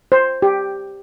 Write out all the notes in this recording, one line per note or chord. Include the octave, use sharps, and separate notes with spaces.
C5
G4